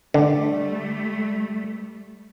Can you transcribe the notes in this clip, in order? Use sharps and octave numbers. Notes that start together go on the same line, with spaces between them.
D3 G3 A3